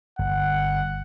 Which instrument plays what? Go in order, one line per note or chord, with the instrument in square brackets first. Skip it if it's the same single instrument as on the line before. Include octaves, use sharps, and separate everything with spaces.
[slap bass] G1 [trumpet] F#5